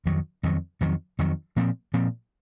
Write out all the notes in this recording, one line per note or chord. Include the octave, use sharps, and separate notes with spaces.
F2 D#3 F#3
F2 D#3 F#3
F2 D#3 F#3
F2 D#3 F#3
A#2 F3 C4
A#2 F3 C4